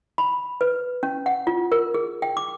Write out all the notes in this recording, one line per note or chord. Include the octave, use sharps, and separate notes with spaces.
B5
B4
C#4
F#5
F4
A#4
G#4
G5
D6